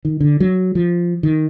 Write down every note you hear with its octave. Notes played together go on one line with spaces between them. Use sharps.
D#3
D3
F#3
F3
D#3